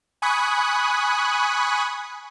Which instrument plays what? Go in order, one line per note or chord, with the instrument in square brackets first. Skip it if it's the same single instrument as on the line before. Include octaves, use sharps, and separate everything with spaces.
[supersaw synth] G#5 B5 C#6 D#6 F#6